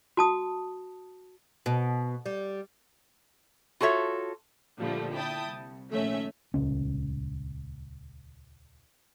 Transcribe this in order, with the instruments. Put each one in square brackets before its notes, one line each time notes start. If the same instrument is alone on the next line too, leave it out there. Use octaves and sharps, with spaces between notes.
[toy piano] F#4 A5 D#6
[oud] B2
G3
[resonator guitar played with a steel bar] F4 F#4 A4 C#5 E5
[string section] A#2 D3 F3 G3 A3
E4 G5 A5 D#6
C2
A#1 D#3 A3 C#4 E5
[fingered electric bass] D#1 C#2 C#4